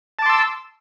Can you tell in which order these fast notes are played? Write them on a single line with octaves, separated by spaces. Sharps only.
A5 D6 C6 E6